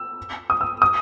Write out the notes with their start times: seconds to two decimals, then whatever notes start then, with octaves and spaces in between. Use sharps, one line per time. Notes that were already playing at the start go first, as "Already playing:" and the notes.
Already playing: E6
0.50 D#6
0.61 E6
0.82 D#6